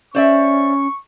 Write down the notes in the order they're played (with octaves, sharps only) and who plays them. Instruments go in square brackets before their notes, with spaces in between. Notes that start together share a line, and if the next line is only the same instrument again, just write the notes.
[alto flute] C#4 [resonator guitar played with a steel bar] C5 D5 E5 [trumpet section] C#6